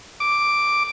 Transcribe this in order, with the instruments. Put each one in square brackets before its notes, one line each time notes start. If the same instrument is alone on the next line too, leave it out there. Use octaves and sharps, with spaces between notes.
[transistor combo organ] D6